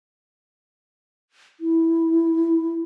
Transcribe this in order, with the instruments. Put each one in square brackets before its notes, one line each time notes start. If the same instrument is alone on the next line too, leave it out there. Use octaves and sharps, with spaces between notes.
[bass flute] E4